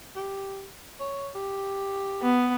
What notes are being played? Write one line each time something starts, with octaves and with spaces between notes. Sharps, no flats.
G4
C#5
G4
B3